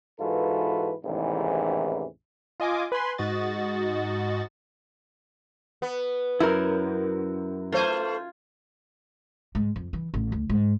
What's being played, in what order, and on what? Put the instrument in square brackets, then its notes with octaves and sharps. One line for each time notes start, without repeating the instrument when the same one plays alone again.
[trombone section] G#2 E3 F4 F#4 A4 B4
A1 E2 G#2 C3 D#3 E3
[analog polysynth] F4 D#5 G#5 D6 D#6
B4 G#5 B5 C6
G#2 F#4 D#5 A6
[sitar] B3
[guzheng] F#2 [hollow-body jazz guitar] E4 A#4
[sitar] A3 C5 [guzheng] F4 G#5
[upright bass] G#2
F2
E3
A1
D2
G#2